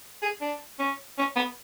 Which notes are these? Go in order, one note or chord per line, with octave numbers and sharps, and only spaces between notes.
G#4
D4
C#4
C#4
B3